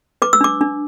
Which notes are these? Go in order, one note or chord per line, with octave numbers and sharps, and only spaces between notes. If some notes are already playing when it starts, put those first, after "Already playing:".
B4 D6
E6
D4 D6
D4